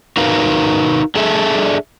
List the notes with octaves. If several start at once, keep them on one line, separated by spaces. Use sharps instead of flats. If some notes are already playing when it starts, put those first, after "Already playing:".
D#4 F#4 A#4 B4 F5
D4 G#4 A4 D5 E5